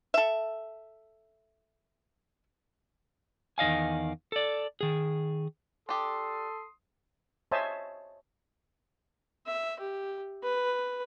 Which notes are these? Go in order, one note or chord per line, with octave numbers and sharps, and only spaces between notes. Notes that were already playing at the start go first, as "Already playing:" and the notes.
A4 E5
E2 D#3 D#5 F5 G#5
A4 D5
D#3 G#4
D4 G4 A4 C6 D#6
C5 C#5 D#5 E5 G#5 A5
E5
G4
B4